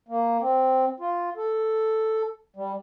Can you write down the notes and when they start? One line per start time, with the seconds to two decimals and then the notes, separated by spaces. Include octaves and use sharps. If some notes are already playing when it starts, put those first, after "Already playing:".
0.09 A#3
0.41 C4
1.00 F4
1.37 A4
2.56 G3